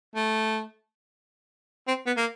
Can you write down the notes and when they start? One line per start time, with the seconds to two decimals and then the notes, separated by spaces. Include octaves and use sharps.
0.16 A3
1.88 C4
2.06 B3
2.17 A#3